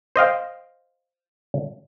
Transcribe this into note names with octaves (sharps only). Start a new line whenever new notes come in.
C5 D#5 F5 G5